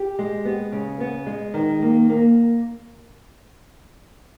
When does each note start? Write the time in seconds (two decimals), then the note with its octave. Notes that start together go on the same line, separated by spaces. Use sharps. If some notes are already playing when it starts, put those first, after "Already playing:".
Already playing: G4
0.19 G#3
0.45 B3
0.72 C#3
1.00 B3
1.27 G#3
1.54 D#3
1.82 A#3
2.10 A#3